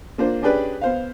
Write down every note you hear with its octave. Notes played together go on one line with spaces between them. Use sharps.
A#3 D4 F4 C5
C#4 D4 G4 G#4 B4 D5
B3 C5 F5